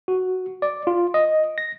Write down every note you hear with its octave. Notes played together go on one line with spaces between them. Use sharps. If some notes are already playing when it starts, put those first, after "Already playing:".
F#4
D5
F4
D#5
A#6